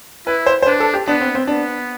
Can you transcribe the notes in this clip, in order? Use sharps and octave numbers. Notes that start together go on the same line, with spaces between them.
E4 B4
C5
C5
D4 B4
A4
G4
B3 D4
C4
C4
B3 D4